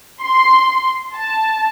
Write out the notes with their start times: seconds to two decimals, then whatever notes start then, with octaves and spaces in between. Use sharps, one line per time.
0.23 C6
1.14 A5